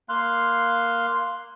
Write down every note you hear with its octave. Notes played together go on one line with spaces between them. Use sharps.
A#3 F5 C6 F#6